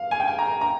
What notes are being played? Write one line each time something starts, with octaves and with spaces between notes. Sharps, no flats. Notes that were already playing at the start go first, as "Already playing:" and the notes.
Already playing: F5
G#5
G5
G#5
A#5
A#5